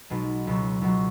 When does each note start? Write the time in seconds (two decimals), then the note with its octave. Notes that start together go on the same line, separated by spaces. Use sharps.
0.10 B1 B2 G#3
0.47 C#2 B2 F#3
0.81 C#2 B2 F#3